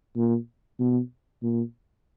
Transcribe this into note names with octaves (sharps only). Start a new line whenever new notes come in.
A#2
B2
A#2